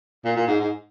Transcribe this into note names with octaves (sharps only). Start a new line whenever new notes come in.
A#2
A#2
G#2
G#2